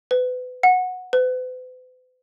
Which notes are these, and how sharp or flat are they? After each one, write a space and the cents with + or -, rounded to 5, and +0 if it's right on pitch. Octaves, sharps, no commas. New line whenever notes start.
B4 +30
F#5 -10
B4 +45